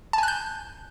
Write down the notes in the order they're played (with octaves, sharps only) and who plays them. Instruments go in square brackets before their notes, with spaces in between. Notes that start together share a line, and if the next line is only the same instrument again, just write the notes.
[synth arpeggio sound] A5
G#5
F#6
G6